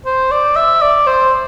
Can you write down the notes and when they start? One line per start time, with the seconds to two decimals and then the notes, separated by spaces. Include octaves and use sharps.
0.06 C5
0.31 D5
0.56 E5
0.82 D5
1.07 C5